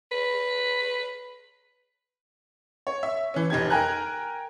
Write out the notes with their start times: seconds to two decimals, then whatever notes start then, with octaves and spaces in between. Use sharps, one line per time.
0.11 B4
2.87 C#5
3.03 E5
3.34 E3 C#4
3.50 F1 D#4 G4 G#6
3.70 A#4 G5 G#5 A#5 F#6